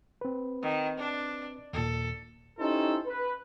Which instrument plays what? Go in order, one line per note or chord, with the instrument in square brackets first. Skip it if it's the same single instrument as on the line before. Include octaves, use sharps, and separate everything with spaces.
[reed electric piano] C4 B4
[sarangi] D#3
D4
[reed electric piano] D#2 A#2 [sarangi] A4
[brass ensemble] C#4 D#4 E4 G4 A4 C5
B4